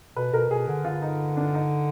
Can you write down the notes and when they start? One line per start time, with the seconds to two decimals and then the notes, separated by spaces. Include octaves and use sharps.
0.16 B2 B4
0.33 B2 A#4
0.50 B2 G#4
0.68 D3 G#4
0.85 D3 F4
1.02 D#4
1.37 D4
1.54 D#4